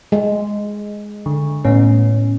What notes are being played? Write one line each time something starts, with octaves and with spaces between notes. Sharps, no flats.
G#3
D3
A2 B3 C#4